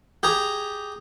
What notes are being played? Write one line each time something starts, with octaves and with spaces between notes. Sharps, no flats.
G4 G#4 A#5